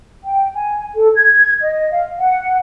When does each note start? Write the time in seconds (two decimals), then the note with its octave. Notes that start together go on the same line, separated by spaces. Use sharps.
0.24 G5
0.54 G#5
0.96 A4
1.16 G#6
1.61 D#5
1.91 F5
2.19 F#5